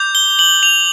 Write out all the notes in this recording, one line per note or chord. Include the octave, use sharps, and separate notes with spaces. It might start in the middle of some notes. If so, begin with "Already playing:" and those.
Already playing: D6 G6
G7
F#7
F7